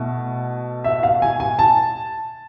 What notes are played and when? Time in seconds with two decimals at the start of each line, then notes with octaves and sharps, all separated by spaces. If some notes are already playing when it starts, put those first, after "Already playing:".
Already playing: B2 A3 E4 A4
0.84 E5
1.03 F5
1.22 G#5
1.40 G#5
1.59 A5